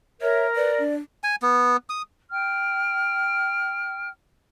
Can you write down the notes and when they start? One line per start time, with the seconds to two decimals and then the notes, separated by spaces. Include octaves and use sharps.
0.22 A#4 C#5 E5
0.56 B4 D5
0.79 D4
1.24 G#5
1.42 B3
1.90 D#6
2.31 G5 F6